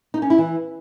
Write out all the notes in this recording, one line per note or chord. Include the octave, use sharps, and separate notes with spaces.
D#4
C#4
E4
E3